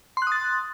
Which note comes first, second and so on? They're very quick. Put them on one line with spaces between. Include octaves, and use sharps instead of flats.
C6 F#6 D#6 A6